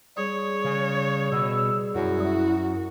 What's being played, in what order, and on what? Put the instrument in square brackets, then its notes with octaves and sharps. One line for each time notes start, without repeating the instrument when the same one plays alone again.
[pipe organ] G3 G#4 [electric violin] C#5
[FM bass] C#3
[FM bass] B2 [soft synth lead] E6
[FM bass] F#2 [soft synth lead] E4 [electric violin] F#4